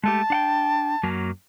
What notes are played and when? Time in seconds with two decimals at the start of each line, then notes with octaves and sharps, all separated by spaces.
0.04 G#3 A3 G4 A5
0.30 D4 F#5 G5
1.03 F#2 F#3 A#3